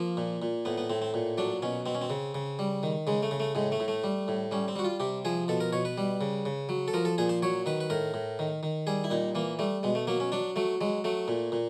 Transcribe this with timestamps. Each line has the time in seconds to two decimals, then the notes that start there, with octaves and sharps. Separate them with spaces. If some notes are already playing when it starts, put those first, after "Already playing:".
Already playing: F3 A#3
0.17 A#2
0.42 A#2
0.65 A2 B3
0.78 B3
0.90 A2 C4
1.02 C4
1.14 A#2
1.38 F#3 D4
1.62 B2 C#4
1.86 B2 C4
1.95 C#4
2.02 C4
2.10 C#3
2.35 C#3
2.59 G3
2.83 D#3
3.07 C#3 G#3
3.23 A3
3.31 C#3
3.40 A3
3.55 A2 G#3
3.72 A3
3.80 A2
3.88 A3
4.04 G3
4.28 A2
4.51 G3 C#4
4.68 C4
4.76 G3 F#4
4.85 F4
5.00 C3 G4
5.25 F3 G#4
5.48 B2 A4
5.60 A#4
5.73 B2 C#5
5.85 B4
5.98 G3
6.21 C#3
6.46 C#3
6.69 F#3
6.88 A4
6.94 F3 A#4
7.05 A4
7.18 A#2 G#4
7.29 C5
7.43 F#3 C#5
7.66 D#3 B4
7.80 B4
7.90 A2 A#4
8.14 A2
8.39 D#3
8.63 D#3
8.87 G3 G#4
9.04 E4
9.10 A#2 D#4
9.35 E3 A#3
9.59 G3 A3
9.83 B2 G#3
9.95 A3
10.07 F#3 A#3
10.20 C#4
10.32 F#3 D4
10.56 F#3 A3
10.81 F#3 G#3
11.04 F#3 A3
11.28 A#2
11.52 A#2